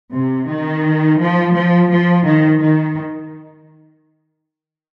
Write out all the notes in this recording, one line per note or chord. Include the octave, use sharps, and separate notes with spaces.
C3
D#3
F3
F3
F3
D#3
D#3